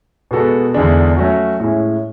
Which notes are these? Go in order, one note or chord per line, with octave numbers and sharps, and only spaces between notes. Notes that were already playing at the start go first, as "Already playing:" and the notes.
B2 G#3 B3 F#4 A4
E2 D3 G#3 D4
F#3 A3 C#4 F#4
A2 G#3 C#4 E4